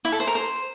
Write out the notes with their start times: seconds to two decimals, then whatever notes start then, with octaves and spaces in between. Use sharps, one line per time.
0.05 E4
0.12 A4
0.20 C5
0.28 A#4
0.35 C5